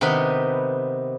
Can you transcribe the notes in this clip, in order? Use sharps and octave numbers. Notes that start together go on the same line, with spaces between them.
C3 D#3 B3 D#4 B4